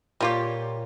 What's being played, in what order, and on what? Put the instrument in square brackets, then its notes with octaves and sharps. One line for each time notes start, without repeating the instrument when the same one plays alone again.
[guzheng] A#2 C#5 [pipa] G3 F4 G4